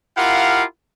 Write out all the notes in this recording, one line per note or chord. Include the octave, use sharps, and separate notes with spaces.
E4 F4 G4 A#4 F5 F#5